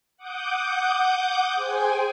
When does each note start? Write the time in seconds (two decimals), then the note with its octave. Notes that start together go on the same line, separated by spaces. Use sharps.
0.17 F#5 D6 D#6 G6
1.54 G#4 C5 G5 G#5